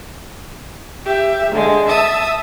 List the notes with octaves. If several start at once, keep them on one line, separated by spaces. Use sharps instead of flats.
G4 E5
D3 G#3
E5 A5 D#6